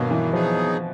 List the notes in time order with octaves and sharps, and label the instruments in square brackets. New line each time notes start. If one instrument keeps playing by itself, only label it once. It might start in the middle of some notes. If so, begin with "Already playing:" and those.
Already playing: [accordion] G2 D#3 F#3 A#3 [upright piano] B2
[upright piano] E3
[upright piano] F3 [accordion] F#3 B3 D#4 G#4